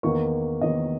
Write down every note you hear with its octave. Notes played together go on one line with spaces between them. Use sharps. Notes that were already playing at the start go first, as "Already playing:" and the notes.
E2 D#3 A#3 C#6
E2 D#3 A#3 D#5